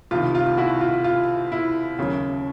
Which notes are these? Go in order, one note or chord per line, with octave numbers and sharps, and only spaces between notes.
C2 C3 D#3 F4
F4
E4 F#4
F4
F4
E4
D#2 C#3 F#3